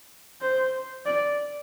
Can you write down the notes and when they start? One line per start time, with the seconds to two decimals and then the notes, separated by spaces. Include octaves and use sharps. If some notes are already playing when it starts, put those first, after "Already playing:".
0.41 C5
1.06 D5